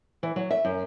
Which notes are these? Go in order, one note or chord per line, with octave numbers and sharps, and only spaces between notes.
E3
F#3
E5
F#2